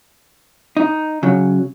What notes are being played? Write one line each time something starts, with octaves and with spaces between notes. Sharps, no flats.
D#4
C#3 F#3